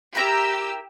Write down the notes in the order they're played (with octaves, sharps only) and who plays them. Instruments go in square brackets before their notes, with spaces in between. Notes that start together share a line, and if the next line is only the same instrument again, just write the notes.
[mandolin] E4 A#4 A#5 [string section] G4 E6